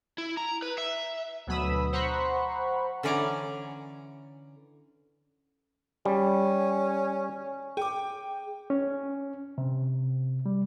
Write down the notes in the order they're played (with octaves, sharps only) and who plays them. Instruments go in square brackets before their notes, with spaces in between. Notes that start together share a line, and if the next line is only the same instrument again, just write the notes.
[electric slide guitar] E4
A#5
B4
E5
[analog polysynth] D2 B2 F#3 B5 D#6 E6
C5 F#5 A#5 B5 C#6
[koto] D3 E3 C#4 D5 G#5 A#5
[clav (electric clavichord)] G3 [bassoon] C#4
[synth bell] G#4 [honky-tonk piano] G5 D6
[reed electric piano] C#4
C3
G3